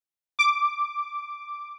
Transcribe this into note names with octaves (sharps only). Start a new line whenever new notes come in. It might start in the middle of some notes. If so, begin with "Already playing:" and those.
D6